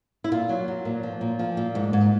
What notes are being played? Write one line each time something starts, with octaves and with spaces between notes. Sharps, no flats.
E4
A#2 F4
F#3
F#3
A#2
F3
A#2
F3
A#2
G#2
G#2